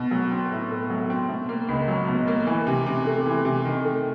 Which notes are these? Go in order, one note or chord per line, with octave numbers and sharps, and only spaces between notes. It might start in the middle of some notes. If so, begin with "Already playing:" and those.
Already playing: B2
F#3
C4
A2
A3
F#3
C4
B2
A#3
C#2
F#3
B2
A#3
E3
C3
C3
A3
E3
C3
D#3
A3